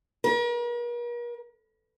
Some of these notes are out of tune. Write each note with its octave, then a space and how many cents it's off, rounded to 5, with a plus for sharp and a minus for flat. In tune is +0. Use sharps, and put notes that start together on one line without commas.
A#4 +45